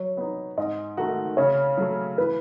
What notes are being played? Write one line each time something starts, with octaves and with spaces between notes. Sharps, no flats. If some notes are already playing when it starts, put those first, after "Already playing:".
Already playing: F#3 C#5
B3 D#4
G#2 D#5
D#3 A3 D#4 F#4
C#3 C#5
F#3 A3
E3 B4